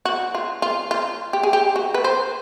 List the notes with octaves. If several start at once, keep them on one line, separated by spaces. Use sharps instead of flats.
F#4
F4
F4
F4
G4
G#4
G4
F#4
B4
C5